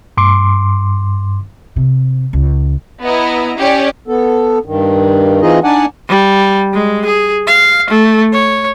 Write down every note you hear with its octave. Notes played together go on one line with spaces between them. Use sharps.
G2 C6 D6
C3
C#2
B3 E4 D#5 A#5
C#4 G4 D5
B3 A4
G2 D#3
E3 C4 D#4 F4 G#4 D#5
D4 D#4 D5 F#5 G#5 A5
G3
G#3
G#4
F5
A3
C#5